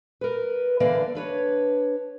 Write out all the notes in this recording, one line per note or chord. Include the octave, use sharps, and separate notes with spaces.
A#4 B4
D3 E3 A#3 B4 D5 F5
D4 B4 C#5